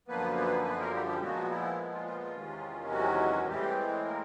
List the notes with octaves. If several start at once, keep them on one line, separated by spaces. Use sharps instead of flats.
F#2 D3 F3 A#3 B3 B4
B3 B4
B3 B4
A#3 A#4
G3 G4
G3 G4
A#2 F3 F#3 G#3 B3 F#4
E4
E4
F4
F4
F4
E2 C3 D#3 G#3 C#4
F#3 F#4
A2 E3 G3 G#3 C4 G4
A#3 A#4